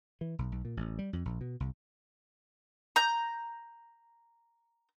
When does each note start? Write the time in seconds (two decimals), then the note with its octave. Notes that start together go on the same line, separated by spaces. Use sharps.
0.21 E3
0.39 B1
0.52 B1
0.65 A#2
0.77 A1
0.99 G3
1.13 F2
1.25 A#1
1.41 B2
1.60 C2
2.96 A#5 G6